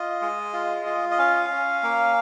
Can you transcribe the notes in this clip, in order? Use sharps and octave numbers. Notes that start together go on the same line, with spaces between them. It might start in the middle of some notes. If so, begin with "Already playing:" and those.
Already playing: F4 D#5
G#3
F4
F4
D#5
C#4 F5
C#4
A#3